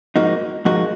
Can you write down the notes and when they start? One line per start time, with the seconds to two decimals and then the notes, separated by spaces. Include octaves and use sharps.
0.16 G#2 F3 A#3 D#4 F#4
0.65 G#2 F3 A#3 D#4 F#4